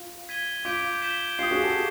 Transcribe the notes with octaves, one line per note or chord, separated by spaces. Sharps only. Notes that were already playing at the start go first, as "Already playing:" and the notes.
Already playing: F4
G#6 B6 D#7 G7
F4 D6 G6 B6 D7
G6 B6 E7 G7
F4 G4 D#6 G6 C7
F#4 G#4
G4 A4